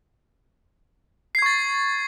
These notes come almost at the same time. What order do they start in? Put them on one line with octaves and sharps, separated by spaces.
C7 G#6 C#6 A6